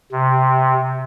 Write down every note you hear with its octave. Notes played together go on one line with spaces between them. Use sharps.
C3